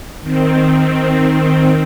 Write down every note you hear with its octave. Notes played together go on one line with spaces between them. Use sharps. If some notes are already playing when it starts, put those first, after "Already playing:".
D#3 C4